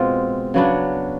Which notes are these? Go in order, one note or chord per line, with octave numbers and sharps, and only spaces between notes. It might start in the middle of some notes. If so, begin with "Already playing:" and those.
Already playing: B2 G#3 C4 F4
C#3 F#3 B3 D4